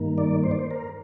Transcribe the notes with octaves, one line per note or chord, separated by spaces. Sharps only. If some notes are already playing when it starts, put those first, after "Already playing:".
Already playing: G2 D#3 A#3
D5
C5
D5
C5
A#4